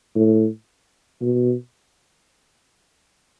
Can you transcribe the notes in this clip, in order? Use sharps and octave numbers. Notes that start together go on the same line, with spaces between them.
A2
B2